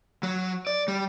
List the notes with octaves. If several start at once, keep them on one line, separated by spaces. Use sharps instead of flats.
F#3
D5
G3